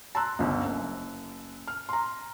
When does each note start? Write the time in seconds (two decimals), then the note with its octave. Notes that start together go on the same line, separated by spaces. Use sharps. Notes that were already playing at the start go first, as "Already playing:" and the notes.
0.15 A5 A#5 C6 E6 F#6
0.39 G1 C#2
0.64 F#1
1.68 F6
1.89 A#5 C6